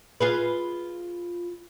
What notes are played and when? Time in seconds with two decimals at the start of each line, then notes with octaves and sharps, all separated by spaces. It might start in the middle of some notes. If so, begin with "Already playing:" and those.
0.21 F4 G#4 B4